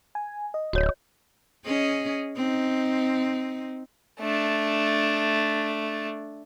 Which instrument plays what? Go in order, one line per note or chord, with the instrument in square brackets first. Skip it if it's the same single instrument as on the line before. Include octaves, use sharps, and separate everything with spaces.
[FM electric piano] G#5
D#5
[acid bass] D1 [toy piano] F#4 C#5
[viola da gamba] C#4 G#4 D#5
C4 D#4
[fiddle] A3 D4